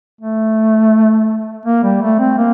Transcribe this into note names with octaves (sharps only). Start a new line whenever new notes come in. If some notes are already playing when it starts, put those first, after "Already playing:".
A3
A#3
G3
A3
C4
A#3